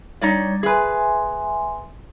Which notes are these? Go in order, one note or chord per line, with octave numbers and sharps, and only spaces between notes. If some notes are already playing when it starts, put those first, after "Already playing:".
G3 D#4 C#5 D5
G#4 B4 E5 G#5 C6